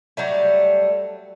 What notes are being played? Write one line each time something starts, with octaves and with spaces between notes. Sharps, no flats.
F#3 G3 A3